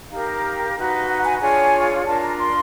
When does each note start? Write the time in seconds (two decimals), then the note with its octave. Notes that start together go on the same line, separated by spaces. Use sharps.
0.09 D#4 G4 A#4 F5
0.75 D#4 F#4 B4
1.07 F#5
1.24 G#5
1.40 D4 F4 G#4 C#5 G#5
2.05 D4 F4 A#4 A5
2.22 A#5
2.38 C6